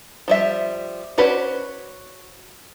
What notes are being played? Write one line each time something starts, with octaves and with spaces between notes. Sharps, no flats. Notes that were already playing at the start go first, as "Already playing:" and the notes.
F3 G3 E5
C#4 F#4 B4 C5 D5